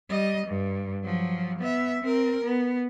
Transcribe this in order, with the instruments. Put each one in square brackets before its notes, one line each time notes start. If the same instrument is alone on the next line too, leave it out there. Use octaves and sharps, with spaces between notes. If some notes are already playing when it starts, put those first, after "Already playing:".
[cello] G3 D#5
G2
F3 F#3
B3 E5
C4 A#4
B3